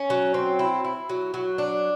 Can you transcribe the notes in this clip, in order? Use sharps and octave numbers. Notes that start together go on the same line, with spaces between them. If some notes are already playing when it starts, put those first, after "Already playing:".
Already playing: C#4
F#3
C4
E4
E4
F#3
F#3
D4